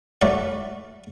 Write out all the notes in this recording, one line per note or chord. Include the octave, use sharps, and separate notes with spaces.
F#3 A3 E4 D5 F#5